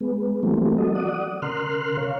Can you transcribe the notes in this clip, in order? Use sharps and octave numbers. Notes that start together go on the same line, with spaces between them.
G#3 B3
E3 F#3 G3 A3 A#3 C4
F#3 F#4 A4 D#5
D5 F#5 D#6
C#3 A#4 C6 F6 F#6
C#5 F5